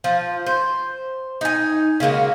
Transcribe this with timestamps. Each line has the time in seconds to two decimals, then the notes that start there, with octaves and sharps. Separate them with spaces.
0.04 F3
0.46 C5
1.41 D#4 G#5
2.00 C#3 G#3 A#3 F#4